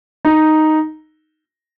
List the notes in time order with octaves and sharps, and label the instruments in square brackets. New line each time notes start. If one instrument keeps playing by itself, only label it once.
[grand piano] D#4